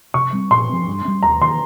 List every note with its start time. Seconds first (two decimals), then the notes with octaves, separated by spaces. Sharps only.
0.14 C3 C#6
0.33 G3 C4
0.51 A#2 C6
0.69 F3 C4
0.87 G2
1.05 G3 C#4
1.23 D#2 A#5
1.41 D#3 A#3 C6